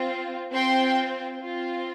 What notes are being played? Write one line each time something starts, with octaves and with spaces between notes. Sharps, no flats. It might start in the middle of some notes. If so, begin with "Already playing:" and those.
Already playing: C4 F4
C4 F4 G5 C6
C4 F4